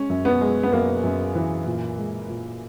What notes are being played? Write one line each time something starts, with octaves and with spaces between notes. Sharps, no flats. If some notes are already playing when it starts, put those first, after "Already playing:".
Already playing: G#3 C#4
F#2
B3
G#3
B3
F#2 A#3
F#2
E3
A#2
G#3
A#2